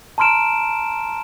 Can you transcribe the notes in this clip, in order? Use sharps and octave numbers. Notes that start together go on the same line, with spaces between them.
A5 A#5 C6 F6 D7 E7